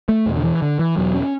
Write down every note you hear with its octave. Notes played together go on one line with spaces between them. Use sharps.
A3
E2 B2
D3
E3
D3
E3
E2 B2 F#3
C#4